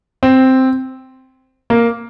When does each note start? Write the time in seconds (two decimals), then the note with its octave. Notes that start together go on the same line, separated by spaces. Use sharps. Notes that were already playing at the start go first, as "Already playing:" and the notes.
0.23 C4
1.70 A#3